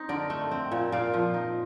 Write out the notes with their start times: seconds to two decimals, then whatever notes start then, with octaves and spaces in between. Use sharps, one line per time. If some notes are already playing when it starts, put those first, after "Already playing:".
Already playing: C4 D#4
0.09 D3 A#4 D5
0.30 A3
0.51 C4
0.71 A#2
0.92 A#2 D5 F5
1.14 F3
1.34 D#4